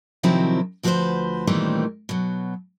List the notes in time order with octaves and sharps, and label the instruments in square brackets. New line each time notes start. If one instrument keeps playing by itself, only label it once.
[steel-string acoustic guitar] C3 D#3 F3 F#3 C4 E4
D2 F3 F#4 G4 B4 C5
A#2 D#3 E3 G3 A3 C4
B2 F#3